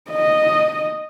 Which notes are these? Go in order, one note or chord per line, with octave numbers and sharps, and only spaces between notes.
D#5